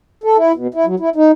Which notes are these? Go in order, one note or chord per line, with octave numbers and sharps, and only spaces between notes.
A4
E4
B2
E4
F#3
E4
D#4